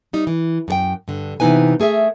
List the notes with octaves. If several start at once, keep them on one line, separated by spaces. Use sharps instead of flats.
G3 D#4
E3
F#2 A4 G5
G2 D3
C3 E3 B3 D#4 B4 G#5
A3 G#4 A#4 E5